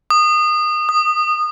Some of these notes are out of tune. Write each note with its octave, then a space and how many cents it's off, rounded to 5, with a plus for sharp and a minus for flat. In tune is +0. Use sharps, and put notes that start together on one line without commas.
D#6 -25
D#6 -10